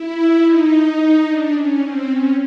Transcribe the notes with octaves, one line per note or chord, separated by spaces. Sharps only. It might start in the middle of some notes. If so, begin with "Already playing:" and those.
Already playing: E4
D#4
D4
C#4
C4
C#4